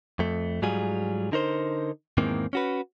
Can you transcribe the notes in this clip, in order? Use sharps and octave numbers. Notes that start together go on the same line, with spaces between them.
F2 A3
G#2 F#3 G3 F4 G#4
D3 D#4 A#4 C5
E2 G#2 D#3 E3 A#3 C4
C#4 F#4 B4